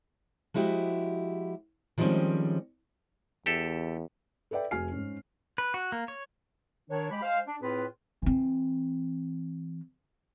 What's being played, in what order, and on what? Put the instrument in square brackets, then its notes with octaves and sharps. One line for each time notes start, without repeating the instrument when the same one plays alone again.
[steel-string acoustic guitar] F3 G#3 E4 F#4 G4
D#3 F3 G3 G#3 C4 C#4
[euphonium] E2 [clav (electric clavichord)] G4 A4 E5
[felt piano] A4 B4 D5 E5 G5
F1 F#4 G#4 G#5 F6 C7
G#2 C#4
[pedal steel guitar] B4
F#4
A#3
C#5
[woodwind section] D#3 D4 C#5
G#3 G4 B5
G#3 C5 F5
D4
A2 C4 F4 G#4 B4
[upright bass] E3 C4